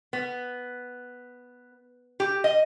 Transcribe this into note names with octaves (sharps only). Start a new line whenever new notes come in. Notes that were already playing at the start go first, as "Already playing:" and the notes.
B3
G4
D#5